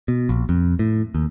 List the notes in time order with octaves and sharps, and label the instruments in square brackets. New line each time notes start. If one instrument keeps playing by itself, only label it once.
[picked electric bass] B2
A#1
F2
A2
D#2